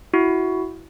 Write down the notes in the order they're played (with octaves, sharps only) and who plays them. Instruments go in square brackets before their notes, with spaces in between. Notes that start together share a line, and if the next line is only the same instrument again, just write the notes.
[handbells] E4 F#4